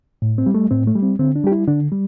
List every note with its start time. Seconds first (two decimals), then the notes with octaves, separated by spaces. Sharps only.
0.22 A2
0.38 C4
0.46 G3
0.54 A3
0.71 A2 C4
0.87 A3
0.95 G3
1.03 C4
1.19 D3 C4
1.36 D4
1.44 G3 G4
1.52 E4
1.68 D3 D4
1.92 G3